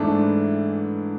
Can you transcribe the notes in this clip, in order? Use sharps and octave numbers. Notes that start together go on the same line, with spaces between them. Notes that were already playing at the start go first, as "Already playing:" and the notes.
Already playing: G#2 E3 A3 D4